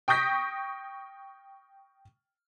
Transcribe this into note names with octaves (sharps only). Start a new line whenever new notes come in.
G5 C#6 D#6 G6 A#6 B6